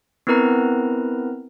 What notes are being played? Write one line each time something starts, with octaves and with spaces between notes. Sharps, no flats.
B3 C4 E4 A#4 B4 A#5